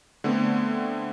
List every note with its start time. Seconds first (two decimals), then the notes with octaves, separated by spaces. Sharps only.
0.24 D3 A3 B3 C4